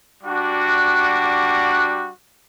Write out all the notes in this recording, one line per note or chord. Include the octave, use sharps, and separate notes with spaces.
G3 D4 F#4